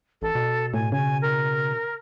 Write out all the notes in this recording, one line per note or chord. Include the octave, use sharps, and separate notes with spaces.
A1 A4
B2
A2 G#5
C#3 G#5
A#4